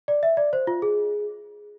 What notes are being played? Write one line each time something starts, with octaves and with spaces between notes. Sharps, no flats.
D5
E5
D5
C5
F4
G#4